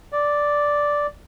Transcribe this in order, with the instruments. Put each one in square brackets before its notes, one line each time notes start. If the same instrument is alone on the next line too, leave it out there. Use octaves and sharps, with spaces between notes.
[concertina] D5